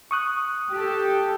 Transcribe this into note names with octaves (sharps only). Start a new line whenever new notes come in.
C#6 D#6 F#6
G4 A4